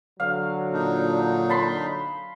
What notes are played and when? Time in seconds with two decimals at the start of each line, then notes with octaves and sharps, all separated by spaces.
0.20 D3 F#3 F5
0.72 A#2 D4 D#4
1.50 A5 B5 C6